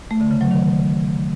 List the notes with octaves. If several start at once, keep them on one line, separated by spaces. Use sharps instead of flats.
A3
D3
C#3
F#3
D#3